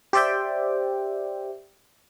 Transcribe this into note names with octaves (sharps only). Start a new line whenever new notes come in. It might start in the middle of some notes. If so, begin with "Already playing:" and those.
G4 C5 D5 E5 G5